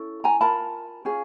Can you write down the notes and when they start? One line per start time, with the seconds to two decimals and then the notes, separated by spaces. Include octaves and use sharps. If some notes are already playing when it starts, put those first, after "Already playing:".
Already playing: C#4 E4 A4
0.24 G#5 A#5
0.41 F4 A#4 A5 B5
1.05 C#4 F4 G#4